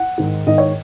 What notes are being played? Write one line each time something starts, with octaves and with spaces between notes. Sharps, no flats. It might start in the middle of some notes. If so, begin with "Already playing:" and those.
Already playing: F#5
G#2 D#3
G#2 D#3 D#5
C#5